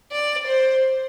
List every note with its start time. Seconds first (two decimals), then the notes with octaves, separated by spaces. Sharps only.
0.12 D5
0.47 C5